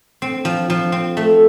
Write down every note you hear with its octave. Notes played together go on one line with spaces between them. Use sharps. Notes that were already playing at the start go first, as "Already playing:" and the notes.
C4
F3
F3
C4
A3